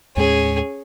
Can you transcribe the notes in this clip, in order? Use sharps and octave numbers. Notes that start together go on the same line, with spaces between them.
D#2 A2 G#3 C#4 G#4